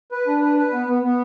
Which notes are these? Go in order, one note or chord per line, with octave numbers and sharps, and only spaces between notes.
B4
D4
B4
B4
B3
B3
B3